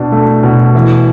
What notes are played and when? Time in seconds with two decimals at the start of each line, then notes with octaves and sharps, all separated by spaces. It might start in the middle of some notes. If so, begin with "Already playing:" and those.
Already playing: B2 D4
0.12 A3
0.43 B2
0.75 E3